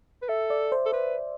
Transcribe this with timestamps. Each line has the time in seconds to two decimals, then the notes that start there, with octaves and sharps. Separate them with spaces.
0.22 B4
0.28 A4 E5
0.50 D5
0.72 C5
0.86 A4
0.92 B4 C5